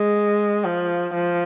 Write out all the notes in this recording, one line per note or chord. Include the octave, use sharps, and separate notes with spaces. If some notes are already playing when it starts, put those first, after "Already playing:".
Already playing: G#3
F3
F3